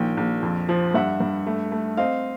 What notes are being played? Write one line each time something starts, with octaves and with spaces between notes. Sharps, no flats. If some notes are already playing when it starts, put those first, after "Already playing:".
Already playing: A#1 D#3 G5
A#1
F2
F3
G2 E5 F#5
G2
A3
A3
C4 D#5 F5